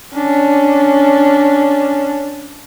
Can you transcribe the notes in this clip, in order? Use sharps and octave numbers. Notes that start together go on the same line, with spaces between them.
C#4 D4